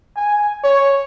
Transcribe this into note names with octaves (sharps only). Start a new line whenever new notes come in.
G#5
C#5